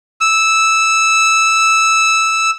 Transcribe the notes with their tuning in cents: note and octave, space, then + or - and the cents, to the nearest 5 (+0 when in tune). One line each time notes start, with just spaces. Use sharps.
E6 -5